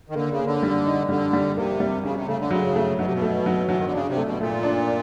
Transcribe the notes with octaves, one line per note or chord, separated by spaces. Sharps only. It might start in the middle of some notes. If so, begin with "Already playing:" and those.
D#3
D3 A#3
C#3
A#3
D3
G3
D#4
D3 G3
G3
C3 A#3
G3
C#3 C#4
B2
C3
C#3 A3
D3
C#3 F#3
A3
B2 F#3
C3
B2
A3
F#3
E3 F#3
D#3
D3
C#3 D4
C3
A3
B2
A#2 A3
D4